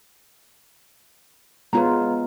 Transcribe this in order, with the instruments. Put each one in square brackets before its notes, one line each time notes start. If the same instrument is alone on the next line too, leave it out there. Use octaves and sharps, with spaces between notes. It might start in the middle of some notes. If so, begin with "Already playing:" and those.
[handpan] G#3 B3 F4 [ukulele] B4 C#5 A#5